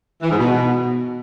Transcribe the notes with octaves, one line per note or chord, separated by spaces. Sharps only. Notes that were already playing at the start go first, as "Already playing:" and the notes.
E3
G#2
B2